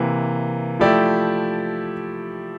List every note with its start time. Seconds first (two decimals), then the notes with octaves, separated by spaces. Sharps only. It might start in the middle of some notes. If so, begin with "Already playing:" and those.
Already playing: C3 E3 A#3
0.79 F3 A3 E4 G4 D5